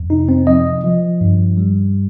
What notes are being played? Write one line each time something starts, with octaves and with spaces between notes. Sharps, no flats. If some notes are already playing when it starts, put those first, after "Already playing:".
Already playing: F2
C3 D#4
C4
F3 D#5
F3
G2
G3